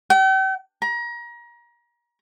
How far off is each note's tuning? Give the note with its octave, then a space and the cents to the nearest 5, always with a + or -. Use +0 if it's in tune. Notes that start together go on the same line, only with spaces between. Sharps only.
G5 -40
A#5 +30